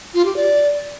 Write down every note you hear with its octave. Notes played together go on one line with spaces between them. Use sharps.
F4
G4
D5